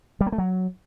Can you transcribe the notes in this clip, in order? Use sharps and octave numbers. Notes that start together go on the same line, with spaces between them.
G3
A#3
A3
F#3